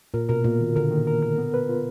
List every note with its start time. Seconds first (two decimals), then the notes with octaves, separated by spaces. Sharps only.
0.14 A#2 A#4
0.29 B2 A#4
0.44 A#2 A#3
0.60 D#3
0.76 D3 A#4
0.91 D#3
1.07 A#4
1.22 A#4
1.38 B3
1.54 B4
1.69 F4